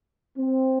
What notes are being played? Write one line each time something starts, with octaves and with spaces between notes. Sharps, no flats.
C4